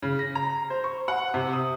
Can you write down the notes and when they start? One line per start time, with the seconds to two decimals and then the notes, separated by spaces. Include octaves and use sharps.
0.02 C#3
0.19 A#6
0.35 A#5
0.70 C5
0.84 C#6
1.08 F#5
1.34 C3
1.53 D#6